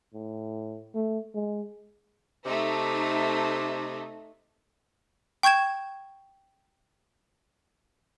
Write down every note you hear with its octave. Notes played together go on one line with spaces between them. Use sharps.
A2
A3
G#3
C3 A3 D#4
G5 C#6 G6 G#6 E7